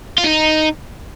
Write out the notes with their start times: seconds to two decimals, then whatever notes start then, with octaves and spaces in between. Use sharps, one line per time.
0.18 F4
0.24 D#4